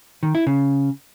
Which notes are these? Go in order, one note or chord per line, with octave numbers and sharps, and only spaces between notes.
D#3
E4
C#3